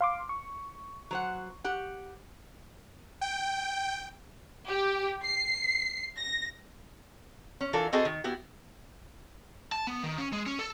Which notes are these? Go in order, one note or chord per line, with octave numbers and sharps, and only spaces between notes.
F5 C6 D6
C#6
F#3 C5 F#5
G4 F#5
G5
G4
C7
A#6
C#4
E3 D4 F4 A4 A#4
C4 F#4 G#4 A4 D#5
D#3
B3 E4 F#4 G4
A5
B3
D#3
C#4
G#3
C#4
A4